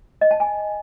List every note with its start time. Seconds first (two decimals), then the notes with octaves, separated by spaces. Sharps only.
0.21 D#5
0.31 A5
0.40 G#5